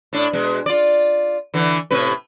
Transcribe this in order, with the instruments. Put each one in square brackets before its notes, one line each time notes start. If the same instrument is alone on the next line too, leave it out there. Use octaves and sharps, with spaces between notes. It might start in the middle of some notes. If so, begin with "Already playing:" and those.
[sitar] A2 D4
B2 G#3
F4 D5
D3 E3
A2 C3 B4